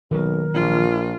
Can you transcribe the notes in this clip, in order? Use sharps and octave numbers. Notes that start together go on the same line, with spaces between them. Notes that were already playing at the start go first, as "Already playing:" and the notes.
B1 D#3 F#3 A#3 A#4
A#1 F4